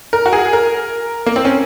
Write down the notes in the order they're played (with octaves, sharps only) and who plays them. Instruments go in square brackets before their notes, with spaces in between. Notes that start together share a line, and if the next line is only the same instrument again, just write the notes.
[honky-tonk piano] A#4
F#4
G#4
A#4
A#3
C4
C#4